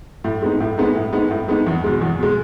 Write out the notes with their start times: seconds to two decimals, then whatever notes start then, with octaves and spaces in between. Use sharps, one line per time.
0.24 A2
0.42 G#3 B3 D#4
0.60 A2
0.78 G#3 B3 D#4
0.95 A2
1.13 G#3 B3 D#4
1.30 A2
1.48 G#3 B3 D#4
1.67 E2
1.84 B2 G#3
2.01 E2
2.19 B2 G#3